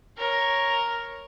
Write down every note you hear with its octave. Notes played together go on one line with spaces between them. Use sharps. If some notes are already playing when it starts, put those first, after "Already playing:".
A#4 C#5